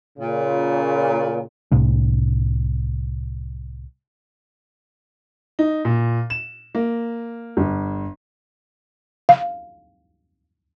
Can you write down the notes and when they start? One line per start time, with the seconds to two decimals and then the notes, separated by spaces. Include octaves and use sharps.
0.19 A#2 C#3
1.72 C2 A2 C3 C#4
5.59 D#4
5.85 A#2
6.30 E7
6.75 A#3
7.57 G1
9.29 F5